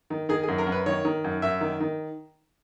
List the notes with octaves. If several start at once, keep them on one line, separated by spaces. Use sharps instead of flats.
D#3
D#3 G#4
G#4
F#2
A#4
F#2
B4
D#3 C#5
D#3
F#2
F#2 E5
D#3
D#3